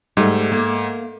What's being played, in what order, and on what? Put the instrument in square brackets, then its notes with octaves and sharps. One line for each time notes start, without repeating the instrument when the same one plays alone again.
[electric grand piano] G#2 [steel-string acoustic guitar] G3 A3
[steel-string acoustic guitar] A#3